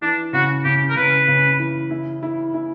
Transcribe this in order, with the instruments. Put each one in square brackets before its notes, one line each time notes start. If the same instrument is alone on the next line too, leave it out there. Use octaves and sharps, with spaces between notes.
[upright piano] E3 [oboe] D4
[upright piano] C#3 [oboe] F#4
[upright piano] C#3 [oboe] G4
[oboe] A#4
[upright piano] C#3 [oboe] B4
[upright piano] C#3
E3
E4
E4
E4